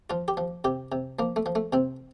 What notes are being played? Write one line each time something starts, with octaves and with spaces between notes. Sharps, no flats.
F3 F4
G4
F3
C3 G4
C3
F3 A#3
A3
F3
A3
C3 C4